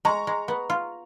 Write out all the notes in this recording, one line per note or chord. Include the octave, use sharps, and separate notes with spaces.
G#3 A#5 C#6
G#3
B3
F4